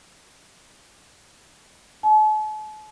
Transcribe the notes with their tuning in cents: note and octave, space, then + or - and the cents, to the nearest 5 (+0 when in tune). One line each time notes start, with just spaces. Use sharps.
A5 -45